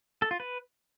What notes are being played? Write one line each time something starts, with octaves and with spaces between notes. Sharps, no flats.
A4
F4
B4